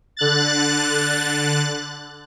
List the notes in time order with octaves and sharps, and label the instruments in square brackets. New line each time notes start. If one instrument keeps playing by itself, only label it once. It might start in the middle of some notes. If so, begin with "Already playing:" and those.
[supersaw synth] D3 F#6 A6